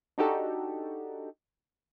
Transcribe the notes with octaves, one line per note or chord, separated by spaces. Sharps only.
D4 D#4 F#4 G4 A4